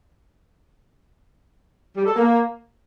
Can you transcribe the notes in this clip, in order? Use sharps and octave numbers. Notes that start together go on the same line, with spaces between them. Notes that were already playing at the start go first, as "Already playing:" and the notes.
G3
A4
A#3